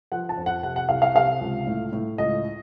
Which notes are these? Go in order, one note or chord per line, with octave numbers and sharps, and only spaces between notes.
F3 F#5
A5
F2
F#5
C3 F#5
F#5
C2 F5
F5
C3 F5
C#2
A2
A2
C#2 D#5